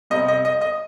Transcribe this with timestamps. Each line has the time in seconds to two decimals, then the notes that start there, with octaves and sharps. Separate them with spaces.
0.10 C3 G3 D#5
0.28 D#5
0.45 D#5
0.61 D#5